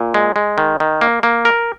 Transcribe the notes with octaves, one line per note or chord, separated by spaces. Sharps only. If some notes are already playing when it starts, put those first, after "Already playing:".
Already playing: A#2
G#3
G#3
D#3
D#3
A#3
A#3
A#4